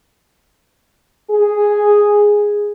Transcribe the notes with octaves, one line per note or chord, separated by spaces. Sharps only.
G#4